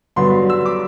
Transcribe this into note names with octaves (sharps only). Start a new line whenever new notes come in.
G2 D3 F#3 B3 D4 C6
E6
D6